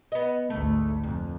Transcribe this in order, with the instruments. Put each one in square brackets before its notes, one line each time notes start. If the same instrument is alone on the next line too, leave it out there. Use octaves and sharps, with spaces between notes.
[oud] B3 D#5
[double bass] G#1 D2 [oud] A3
[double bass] F2 [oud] A#2